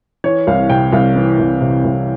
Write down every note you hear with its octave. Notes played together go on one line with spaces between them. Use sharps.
E3 C#5
C2 F5
C3 G5
C2 F5
E3
C2
C3
C2